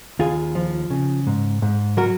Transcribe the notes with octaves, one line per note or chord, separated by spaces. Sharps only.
D#2 F4 G#4
F3
C#3
G#2
G#2
F#3 F#4 A#4